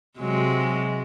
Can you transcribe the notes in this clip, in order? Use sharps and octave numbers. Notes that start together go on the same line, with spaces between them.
C3 F#3 G#3